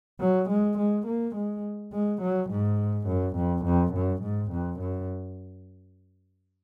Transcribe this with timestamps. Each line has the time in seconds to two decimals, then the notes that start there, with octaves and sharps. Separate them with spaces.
0.20 F#3
0.49 G#3
0.78 G#3
1.06 A#3
1.35 G#3
1.92 G#3
2.22 F#3
2.50 G#2
3.07 F#2
3.36 F2
3.65 F2
3.94 F#2
4.23 G#2
4.51 F2
4.80 F#2